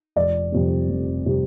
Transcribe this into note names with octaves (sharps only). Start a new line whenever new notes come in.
F1 D5
F2 C3 G3
F1
C3 G3